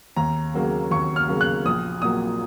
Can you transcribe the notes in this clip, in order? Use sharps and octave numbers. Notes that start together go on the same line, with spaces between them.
D#2 A#5
C#3 F#3 A#3
D#2 C#6
F6
C#3 F#3 A#3
F#6
A#1 D#6
A#2 F#3 A#3 D#6